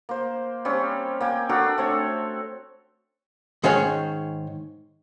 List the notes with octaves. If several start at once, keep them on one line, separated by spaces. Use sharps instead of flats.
A#3 C5
G3 C4 C#4
A#3 G5 G#5
D4 F#4 A4 A#4
A3 C4 C#5
G#2 D#3 C#4 G#4 C#5 F#5